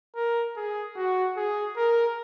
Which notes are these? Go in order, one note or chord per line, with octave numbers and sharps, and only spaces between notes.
A#4
G#4
F#4
G#4
A#4